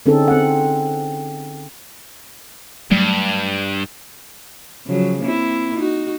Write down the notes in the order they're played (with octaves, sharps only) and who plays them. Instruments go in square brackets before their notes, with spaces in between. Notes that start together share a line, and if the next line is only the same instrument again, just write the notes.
[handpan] D3 C4 C#4 D#4 G#4 A4
C4 F#5
[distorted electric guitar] G2 [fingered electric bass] F#3 G3 A3
[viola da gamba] C#3 F3 F#3
A#3 C4 E4
D#4 F#4